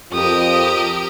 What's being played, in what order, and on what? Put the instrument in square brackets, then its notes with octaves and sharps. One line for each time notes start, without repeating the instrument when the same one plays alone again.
[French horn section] F2 [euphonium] F4 [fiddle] G4 A#4 [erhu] D#6